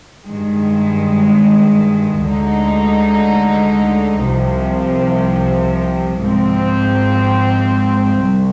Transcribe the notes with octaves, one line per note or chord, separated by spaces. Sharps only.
G2 D#3 G#3
D2 D3 G#3 D#4
C2 C3 F3
G#2 F3 C4
C2